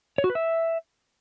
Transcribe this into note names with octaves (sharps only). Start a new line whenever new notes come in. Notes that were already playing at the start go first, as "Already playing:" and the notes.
C#5
F#4
B4
E5